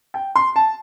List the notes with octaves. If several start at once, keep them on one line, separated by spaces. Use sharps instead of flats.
G5
C6
A5